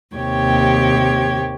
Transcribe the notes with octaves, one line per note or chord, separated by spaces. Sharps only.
D#2 C3 G4 C#5 G5 G#6